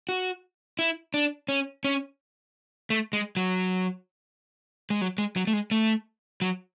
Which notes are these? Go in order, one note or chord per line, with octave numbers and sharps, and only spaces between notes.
F#4
E4
D4
C#4
C#4
A3
G#3
F#3
G#3
F#3
G#3
F#3
A3
G#3
A3
F#3